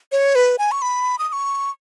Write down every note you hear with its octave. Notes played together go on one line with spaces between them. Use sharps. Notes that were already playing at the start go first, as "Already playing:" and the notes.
C#5
B4
G#5
C#6
B5
D#6
D#6
C#6